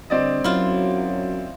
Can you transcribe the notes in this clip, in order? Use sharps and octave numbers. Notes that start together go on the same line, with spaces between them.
G2 D3 C4 D5 D#5
F#2 F#3 E4 F4